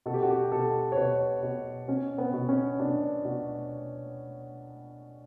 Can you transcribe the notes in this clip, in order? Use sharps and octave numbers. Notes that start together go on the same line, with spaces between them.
B2 A4
G4
F#4
G4
B2 A4
C#5
B2 B4
B2
B2 C#4
B3
B2
C#4
B2 D4
B2